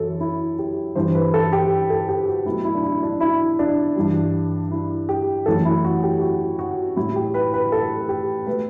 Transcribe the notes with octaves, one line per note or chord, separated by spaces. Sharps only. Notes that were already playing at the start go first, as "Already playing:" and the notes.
Already playing: F#2 E3 A4
E4
G4
G2 E3 G3 C5
B4
A4
G4
A4
G4
F#4
B2 F#3 A3 E4
E4
D4
E4
D4
E4
D4
G2 E3 G3
E4
G4
F#2 E3 A3 A4
E4
F#4
G4
F#4
F#4
A2 G3 E4
G4
B4
B4
A4
G4
B2 A3 B4